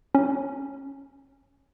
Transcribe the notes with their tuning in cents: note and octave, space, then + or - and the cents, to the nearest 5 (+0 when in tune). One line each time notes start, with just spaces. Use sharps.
C#4 -10